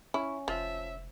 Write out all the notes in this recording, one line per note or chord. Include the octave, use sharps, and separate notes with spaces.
C#4 E4
F1 F3 E5